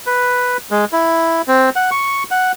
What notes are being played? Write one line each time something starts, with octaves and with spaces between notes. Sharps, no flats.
B4
G#3
E4
C4
F#5
C#6
F#5